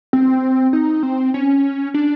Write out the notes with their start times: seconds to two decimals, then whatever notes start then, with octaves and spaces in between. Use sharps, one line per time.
0.13 C4
0.73 D#4
1.03 C4
1.34 C#4
1.94 D4